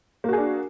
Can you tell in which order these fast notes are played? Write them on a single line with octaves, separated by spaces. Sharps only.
A#3 F#4 G#4 D4